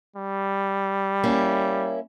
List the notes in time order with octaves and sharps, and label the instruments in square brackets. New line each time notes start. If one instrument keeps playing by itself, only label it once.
[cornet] G3
[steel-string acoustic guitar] A#3 C#4 E4